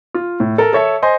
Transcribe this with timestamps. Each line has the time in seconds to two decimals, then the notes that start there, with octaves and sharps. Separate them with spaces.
0.14 F4
0.40 A2
0.58 A4 A#4
0.73 A4 C#5 E5 A5
1.02 C5 D#5 G#5 C6